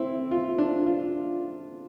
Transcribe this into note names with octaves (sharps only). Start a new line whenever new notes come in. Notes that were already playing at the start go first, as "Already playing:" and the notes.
Already playing: C4 E4
F4
D4
F4